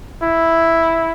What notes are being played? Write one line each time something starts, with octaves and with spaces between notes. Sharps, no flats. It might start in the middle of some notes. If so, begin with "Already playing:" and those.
E4